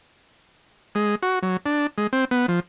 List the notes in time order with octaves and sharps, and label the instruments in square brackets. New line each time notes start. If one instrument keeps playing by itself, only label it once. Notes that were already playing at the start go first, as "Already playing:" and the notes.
[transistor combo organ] G#3
F#4
F#3
D4
G#3
C4
B3
F3